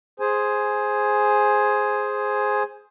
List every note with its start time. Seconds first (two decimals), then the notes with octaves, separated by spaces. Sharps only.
0.20 G#4 C5 G#5